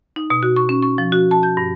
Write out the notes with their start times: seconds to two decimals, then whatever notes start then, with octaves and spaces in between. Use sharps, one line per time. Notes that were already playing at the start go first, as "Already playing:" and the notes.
0.16 D#4
0.30 B2
0.43 F#4
0.56 C#6
0.69 C#4
0.82 C#6
0.98 F3
1.12 F#4
1.31 A5
1.43 G6
1.57 G2